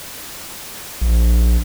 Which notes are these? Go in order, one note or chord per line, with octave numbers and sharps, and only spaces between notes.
A#1